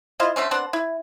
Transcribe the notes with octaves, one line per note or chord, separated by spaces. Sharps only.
E4 F4 C5 D#5
D3 A3 C4 C#4
B3 C4 D4 F#5
E4